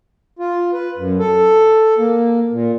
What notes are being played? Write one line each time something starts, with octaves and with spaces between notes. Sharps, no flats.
F4
B4
F#2
A4
A#3
A#2